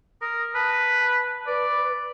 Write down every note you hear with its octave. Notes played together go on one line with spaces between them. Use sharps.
A#4 D#6
B4 A5
B4 D5